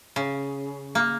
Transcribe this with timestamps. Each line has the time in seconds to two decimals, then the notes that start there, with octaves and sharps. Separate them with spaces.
0.16 C#3
0.95 A#3